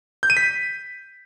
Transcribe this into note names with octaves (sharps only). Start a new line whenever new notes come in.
G6
D#7
B6